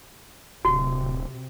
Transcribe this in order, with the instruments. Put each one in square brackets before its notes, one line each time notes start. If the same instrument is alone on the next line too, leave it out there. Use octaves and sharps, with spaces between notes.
[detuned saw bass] D1 [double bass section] C3 [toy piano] F#4